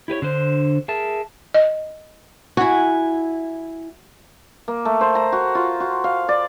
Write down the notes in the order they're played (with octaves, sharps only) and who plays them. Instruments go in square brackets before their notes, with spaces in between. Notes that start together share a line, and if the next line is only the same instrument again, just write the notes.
[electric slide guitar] E4 G4 B4 C#5
D3 D4 C5
G#4 A#4 E5 A5
[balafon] D#5
[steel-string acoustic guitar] E4 G#5 [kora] F#4
[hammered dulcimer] A#3
A3
C5
A#5
F#4
F4
F#4
F5
D5